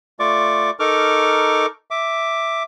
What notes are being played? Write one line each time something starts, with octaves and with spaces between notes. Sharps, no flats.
A3 F4 D5 C#6 D6
D#4 A4 A#4 C#6 D6 F6
E5 D6